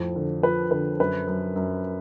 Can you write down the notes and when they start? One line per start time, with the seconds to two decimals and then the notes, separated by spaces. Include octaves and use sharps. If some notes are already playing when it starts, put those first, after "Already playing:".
Already playing: F2 A2
0.16 D3
0.43 F3 B4
0.71 D3 B4
1.00 F#2 B4
1.27 F#2
1.56 F#2